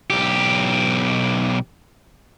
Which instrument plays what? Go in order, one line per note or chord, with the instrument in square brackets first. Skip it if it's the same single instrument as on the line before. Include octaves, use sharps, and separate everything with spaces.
[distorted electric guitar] B1 G4